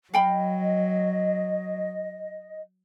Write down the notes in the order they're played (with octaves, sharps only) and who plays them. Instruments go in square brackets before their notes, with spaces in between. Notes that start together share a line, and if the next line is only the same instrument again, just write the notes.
[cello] F#3 [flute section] D#5 [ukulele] F5 G5 B5